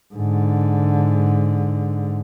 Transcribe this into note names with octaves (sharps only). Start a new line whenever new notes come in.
G#2 D3